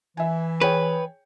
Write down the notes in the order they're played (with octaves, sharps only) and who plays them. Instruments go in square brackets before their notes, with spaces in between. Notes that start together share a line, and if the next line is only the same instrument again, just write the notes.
[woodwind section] E3 [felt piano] E5 G#5
[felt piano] G#4 C#5 G5 [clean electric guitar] B4